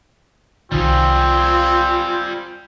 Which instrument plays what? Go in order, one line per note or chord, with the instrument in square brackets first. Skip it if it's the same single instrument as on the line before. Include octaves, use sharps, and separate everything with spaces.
[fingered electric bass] C2 D#3 [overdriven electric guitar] G3 G#4 [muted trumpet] C4 [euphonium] F4